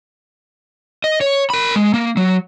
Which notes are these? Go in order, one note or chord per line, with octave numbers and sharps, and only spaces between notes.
D#5
C#5
A#4 B5
G#3
A#3
F#3